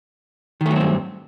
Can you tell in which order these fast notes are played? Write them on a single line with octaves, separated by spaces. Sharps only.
D#3 A3 F#3 C4 G2